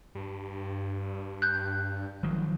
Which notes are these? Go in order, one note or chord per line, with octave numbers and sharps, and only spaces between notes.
G2
F#6 G6
G#1 D#3 F3 F#3